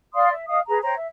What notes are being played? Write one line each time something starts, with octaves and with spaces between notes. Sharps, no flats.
D5 F5 C6 D#6
E5
D#5 F5 D#6
G#4 B4 A#5
C5 C#5 G5 A#5
E5